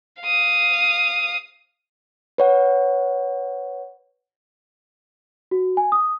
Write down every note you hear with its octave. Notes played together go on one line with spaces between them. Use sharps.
F5 D#6
B4 C#5 F#5
F#4
G#5
D#6